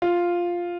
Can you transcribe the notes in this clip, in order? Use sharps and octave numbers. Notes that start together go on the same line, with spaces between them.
F4